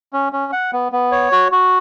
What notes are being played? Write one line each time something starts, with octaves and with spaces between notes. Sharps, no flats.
C#4
C#4
F#5
B3
B3
C#5
F#4
F#4